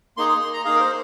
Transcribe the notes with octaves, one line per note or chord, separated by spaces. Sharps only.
A#3 D#4 G#4 C6
C6
C6
A#5
A#3 D#4 G#4 F5
A#4
C5